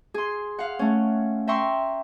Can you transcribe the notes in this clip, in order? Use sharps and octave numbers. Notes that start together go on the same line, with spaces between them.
G#4 C6
F5 F#5
A3 C#4
E5 G5 A#5 C6 C#6 E6